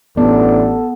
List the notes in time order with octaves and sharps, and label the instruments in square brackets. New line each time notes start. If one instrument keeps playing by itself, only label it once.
[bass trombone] A1 [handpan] B3 [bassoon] D4 [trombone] A4